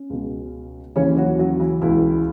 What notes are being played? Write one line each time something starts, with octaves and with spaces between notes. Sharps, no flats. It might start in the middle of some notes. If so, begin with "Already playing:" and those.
Already playing: C#4
C#2 B2
D#2 C#3 E3 C#4 C#5
F#3 F#4
F#3 F#4
E3 E4
C#2 B2 E3 E4